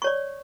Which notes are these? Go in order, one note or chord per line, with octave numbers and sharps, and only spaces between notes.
C#5 D5 C#6